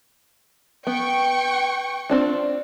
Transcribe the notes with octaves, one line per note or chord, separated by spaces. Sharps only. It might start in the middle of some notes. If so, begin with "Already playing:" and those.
B3 G5 C#6
C4 D4 F4